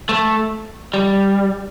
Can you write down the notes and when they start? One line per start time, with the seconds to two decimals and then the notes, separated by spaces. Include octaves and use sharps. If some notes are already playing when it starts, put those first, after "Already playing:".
0.09 A3
0.94 G3